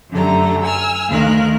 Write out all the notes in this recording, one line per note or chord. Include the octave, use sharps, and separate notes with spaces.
F#2 D3 F#3 A3 G4 A#5
G#5 E6 F6
D2 D#3 A#4 F5 F#6